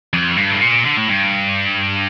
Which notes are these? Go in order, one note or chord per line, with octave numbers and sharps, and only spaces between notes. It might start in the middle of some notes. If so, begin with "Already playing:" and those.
F2
G2
A2
A#2
D3
A2
G2